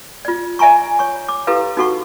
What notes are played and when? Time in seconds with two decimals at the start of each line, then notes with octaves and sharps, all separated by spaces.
0.25 F4 D5
0.59 D5 E5 G#5 A#5 C#6
0.99 C#5 C#6
1.29 D6
1.47 E4 G4 A4 B4 F5
1.77 D#4 F#4 A4 F#5 C#6